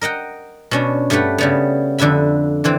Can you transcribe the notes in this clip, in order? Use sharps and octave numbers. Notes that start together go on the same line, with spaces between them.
A#4 D#5 F#5 G5
B2 C#4 D4
G2 A3 G4 B4 F#5 B5
C#3 G3 B3
F2 D3 B4 E5 B5
D3 E3 C4